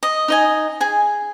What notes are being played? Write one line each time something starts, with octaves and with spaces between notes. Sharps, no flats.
D#5
D#4 D#5 G#5
G#4 G#5